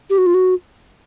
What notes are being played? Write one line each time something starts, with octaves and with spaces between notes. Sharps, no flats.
G4
F#4
F4
F#4